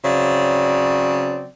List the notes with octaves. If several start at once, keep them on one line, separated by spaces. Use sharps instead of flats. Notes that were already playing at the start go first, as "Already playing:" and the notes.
C#3 F#3 C4 D5